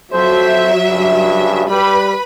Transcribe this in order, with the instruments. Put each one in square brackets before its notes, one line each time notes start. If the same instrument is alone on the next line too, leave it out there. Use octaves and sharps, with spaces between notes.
[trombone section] F2 A4 C5 [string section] F#3 E5
[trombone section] G2 C#3
[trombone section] G3 [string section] B4 B5